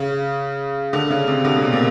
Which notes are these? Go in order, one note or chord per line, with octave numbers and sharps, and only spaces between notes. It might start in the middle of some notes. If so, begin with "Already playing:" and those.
Already playing: C#3
D3
C#3
C3
D3
B2
C3
A#2